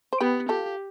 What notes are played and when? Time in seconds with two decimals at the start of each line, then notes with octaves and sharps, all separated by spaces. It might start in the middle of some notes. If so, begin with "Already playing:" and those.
0.13 C5
0.20 B3 G4 B4
0.49 F4 G4 A4